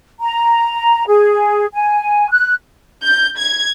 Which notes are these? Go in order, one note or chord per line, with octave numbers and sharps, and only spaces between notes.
A#5
G#4
G#5
F#6
G6
G#6